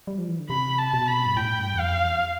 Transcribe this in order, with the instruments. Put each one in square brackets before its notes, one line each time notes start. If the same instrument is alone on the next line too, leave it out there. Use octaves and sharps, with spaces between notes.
[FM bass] G3
F3
E3
D3
[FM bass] C3 [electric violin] B5
[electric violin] A5
[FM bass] B2
[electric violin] B5
[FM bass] G2
[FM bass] A2 [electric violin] G5
[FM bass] G2
E2
[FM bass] F2 [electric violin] F5
[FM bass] E2